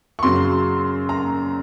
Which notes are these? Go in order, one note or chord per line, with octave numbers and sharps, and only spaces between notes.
C#6
F#2 C#3 F#3 C6
A#5